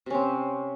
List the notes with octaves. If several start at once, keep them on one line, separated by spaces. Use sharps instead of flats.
C3 C4 C#4